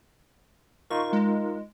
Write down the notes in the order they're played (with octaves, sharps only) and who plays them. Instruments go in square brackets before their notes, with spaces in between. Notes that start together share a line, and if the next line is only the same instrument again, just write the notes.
[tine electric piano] D#4 F4 A#4 [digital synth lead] C#6
[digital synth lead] G#3